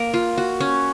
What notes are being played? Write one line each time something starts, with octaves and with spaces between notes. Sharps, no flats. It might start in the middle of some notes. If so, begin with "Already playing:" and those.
Already playing: A#3 A#4
F4
F#4
C#4